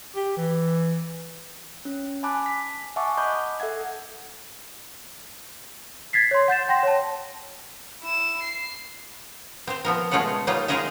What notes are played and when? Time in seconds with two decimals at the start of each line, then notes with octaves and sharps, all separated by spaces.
0.16 G4
0.37 E3
1.85 C#4
2.23 G#5 A5 B5 D6 F#6
2.46 B6
2.96 E5 F#5 G#5 A5 C#6 D6
3.18 D#5 B5 D6 D#6 F#6 G6
3.60 A4 E5 F#5 G#6
6.13 G#6 A6 B6 C7
6.31 C#5 C6
6.48 F#5 G6 A6 E7
6.68 F#5 G5 C6 A#6
6.83 C#5 A5
8.02 E4 E7
8.43 C7
9.67 C4 C5
9.85 F3 B3 A#4
10.11 B2 G#3 A3 F4 F#4 F#5
10.47 F#3 G3 A#3 D#4 F4
10.68 G#3 D#4 F4 G#4 D#5 E5